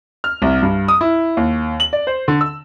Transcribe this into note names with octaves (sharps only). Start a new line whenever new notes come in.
F6
C2
G2
D#6
E4
D#2
F#7
D5
C5
D3
E6